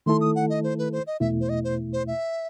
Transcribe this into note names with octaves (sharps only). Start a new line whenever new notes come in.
D#3 A3 E4 A4 C6
D#6
F#5
D#5
C5
B4
C5
D#5
E2 B2 A3 E4 E5
C5
D#5
C5
C5
E5